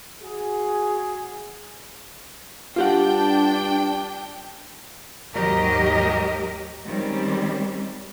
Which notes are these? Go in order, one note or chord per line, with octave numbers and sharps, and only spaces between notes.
F#4 G#4
G2 D4 F4 G4 F#5 G5
D#2 G#2 F#3 G4 A#4 D#5
D#3 G3 G#3 C4 C#4